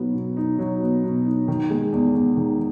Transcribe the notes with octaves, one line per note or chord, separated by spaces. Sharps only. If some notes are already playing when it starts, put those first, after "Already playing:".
Already playing: B2 F#3 B3 D#4
B2
D#4
F#3
B3
B2
D#4
D#3
G#3
E2
E2
D#3